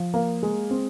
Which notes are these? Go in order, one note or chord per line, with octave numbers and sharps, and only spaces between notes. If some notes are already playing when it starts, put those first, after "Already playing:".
Already playing: F3
A#3
G#3
C4